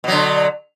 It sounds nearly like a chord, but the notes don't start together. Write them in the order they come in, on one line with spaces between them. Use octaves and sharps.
B2 F#3 D3